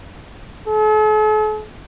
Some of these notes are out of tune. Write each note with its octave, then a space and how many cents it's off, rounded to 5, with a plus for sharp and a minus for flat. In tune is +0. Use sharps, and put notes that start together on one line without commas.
A4 -45